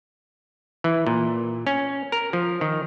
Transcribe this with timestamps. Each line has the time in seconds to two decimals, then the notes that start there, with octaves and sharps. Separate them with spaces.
0.84 E3
1.07 A#2
1.67 C#4
2.12 A#4
2.33 F3
2.61 D#3